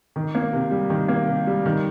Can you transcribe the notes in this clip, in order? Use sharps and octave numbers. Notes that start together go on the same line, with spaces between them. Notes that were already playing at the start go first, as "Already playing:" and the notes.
D#3
A#3
C3
G3
D#3
A#3
C3
G3
D#3